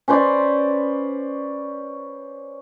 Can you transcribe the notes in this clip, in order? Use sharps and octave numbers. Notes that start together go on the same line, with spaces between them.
C#4 B4 C5 D5